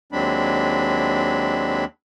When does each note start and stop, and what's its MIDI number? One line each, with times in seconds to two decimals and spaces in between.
0.12 1.85 39
0.12 1.85 54
0.12 1.85 56
0.12 1.85 60
0.12 1.85 62
0.12 1.85 83